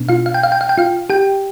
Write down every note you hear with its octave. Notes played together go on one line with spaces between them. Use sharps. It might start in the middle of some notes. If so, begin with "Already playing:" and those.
Already playing: B2 B3 D4
F4 F5
F5
G5
F5
G5
F5
G5
F4 F5
G4 G5